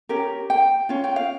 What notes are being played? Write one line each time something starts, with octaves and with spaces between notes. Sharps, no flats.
C#4 G4 A#4
G5
C#4 F4
G5
F5